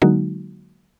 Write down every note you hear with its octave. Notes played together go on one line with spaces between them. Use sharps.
D3 F#3 G#3 A#3 D#4 F#4